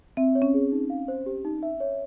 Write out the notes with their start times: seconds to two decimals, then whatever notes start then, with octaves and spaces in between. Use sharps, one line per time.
0.17 C4 E5
0.35 C#5
0.42 C#4
0.54 G#4
0.72 D#4
0.90 F5
1.08 C5
1.26 G4
1.45 D#4
1.63 E5
1.80 C#5